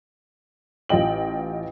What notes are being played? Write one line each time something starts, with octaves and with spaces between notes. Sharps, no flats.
A1 F4 D#5 G5 F#7